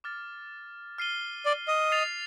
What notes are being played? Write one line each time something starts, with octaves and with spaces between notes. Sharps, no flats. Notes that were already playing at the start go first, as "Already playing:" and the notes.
D6 F6 A6
F6 C7 D#7 G7
D5
D#5
A6 C7 F7